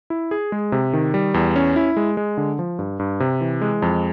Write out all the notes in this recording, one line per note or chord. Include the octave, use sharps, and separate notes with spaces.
E4
G#4
G#3
C3
D#3
G3
E2
C#4
E4
G#3
G#3
D3
F3
G2
G2
C3
E3
G#3
F2